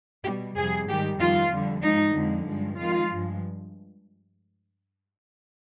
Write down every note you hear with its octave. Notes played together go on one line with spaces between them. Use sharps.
B2 G3 G4
F2 C3 G3 G#4
G#2 D#3 G3 G4
F2 D#3 G3 F4
F2 D3 G3
G#2 F3 G#3 D#4
F2 D3 F3 G#3
G2 F3 G#3
F2 D#3 G#3 F4
G2 F3 G#3